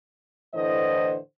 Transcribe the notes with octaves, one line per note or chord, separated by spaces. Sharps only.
A2 D3 E3 C5 D#5